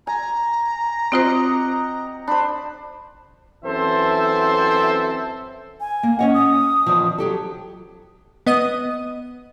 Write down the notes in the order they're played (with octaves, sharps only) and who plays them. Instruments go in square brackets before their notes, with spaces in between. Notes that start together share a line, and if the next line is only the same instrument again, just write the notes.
[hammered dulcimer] G#5 [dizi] A#5
[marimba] C4 F4 C5 [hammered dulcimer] G4 D#5 F#5
[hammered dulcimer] D4 C5 [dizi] B5
[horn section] F#2 E3 C4 A4 C5 E5
[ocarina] G#5
[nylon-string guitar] A#3
[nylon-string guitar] C#4 C#5 F#5 [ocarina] D#5
[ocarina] D#6
[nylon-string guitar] E2 D#3 F3
F#3 G4 A4
[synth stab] B3 D#5 D#6